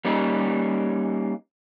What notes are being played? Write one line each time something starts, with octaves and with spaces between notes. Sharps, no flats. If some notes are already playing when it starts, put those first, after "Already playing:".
G3 A#3 C#4 D#4